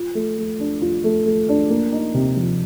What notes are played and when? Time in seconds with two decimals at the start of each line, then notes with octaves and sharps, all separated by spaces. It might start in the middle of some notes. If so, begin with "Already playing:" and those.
Already playing: F4
0.15 A3
0.38 A3
0.60 D4
0.82 F4
1.04 A3
1.25 A3
1.49 D4
1.70 A#3
1.92 D#4
2.14 C3
2.36 F3